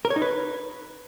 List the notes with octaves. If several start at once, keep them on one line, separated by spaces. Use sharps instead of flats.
A#4
C#5
D#4
B4